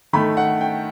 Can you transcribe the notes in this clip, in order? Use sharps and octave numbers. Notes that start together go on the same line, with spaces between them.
D#3 A3 B5
F#5
G5